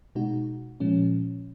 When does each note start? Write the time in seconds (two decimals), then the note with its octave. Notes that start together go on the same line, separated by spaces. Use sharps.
0.15 B2 G#3 D#4 F#4
0.80 A#2 F3 G#3 C#4